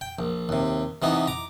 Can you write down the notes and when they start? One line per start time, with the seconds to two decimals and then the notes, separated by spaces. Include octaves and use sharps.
0.01 G5
0.19 A#1
0.49 D#2 C3
1.02 C3 E3 B3 D#4
1.27 A#5 D6